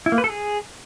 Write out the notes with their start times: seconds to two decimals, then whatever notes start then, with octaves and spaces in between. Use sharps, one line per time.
0.06 E4
0.12 A#3
0.18 B4
0.24 A4
0.30 G#4